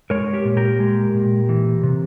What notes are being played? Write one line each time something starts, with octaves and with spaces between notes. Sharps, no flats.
G#3 A#4 C#5
G4 A#4
A#2
G4 A#4
G#3
A#2
E3
C3